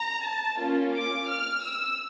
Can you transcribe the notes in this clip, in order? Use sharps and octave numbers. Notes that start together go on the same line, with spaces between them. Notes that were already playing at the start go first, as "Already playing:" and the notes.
Already playing: A#5
A5
A#3 C#4 F4
D6
F6
E6